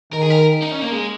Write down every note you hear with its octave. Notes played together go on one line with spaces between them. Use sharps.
D#3 A#4
G#4
A#4
D#4
C#4
A#3
G#3